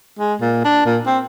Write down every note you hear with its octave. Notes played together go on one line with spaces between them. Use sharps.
G#3
A#2
D4
A#2
C4